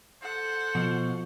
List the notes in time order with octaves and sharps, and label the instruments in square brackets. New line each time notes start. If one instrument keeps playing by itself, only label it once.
[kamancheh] A4 F#5 [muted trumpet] C5
[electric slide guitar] B2 [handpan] F3